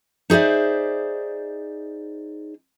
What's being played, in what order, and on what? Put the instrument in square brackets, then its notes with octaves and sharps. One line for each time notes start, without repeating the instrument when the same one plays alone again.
[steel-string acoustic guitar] D#4 G#4 C5 D5 E5